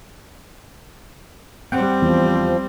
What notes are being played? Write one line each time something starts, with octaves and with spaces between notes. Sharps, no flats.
G3 C4 F#5 G5
E2 F3